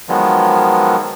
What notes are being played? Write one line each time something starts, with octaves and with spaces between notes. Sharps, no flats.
D#3 F3 F#3 G#3 B3